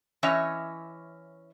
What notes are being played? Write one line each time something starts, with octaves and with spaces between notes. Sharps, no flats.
E3 C#4 C#5 D#5 E5